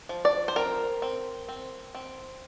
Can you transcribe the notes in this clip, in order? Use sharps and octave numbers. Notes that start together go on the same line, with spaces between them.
F3
D5
C5
C4 A#4
C4
C4
C4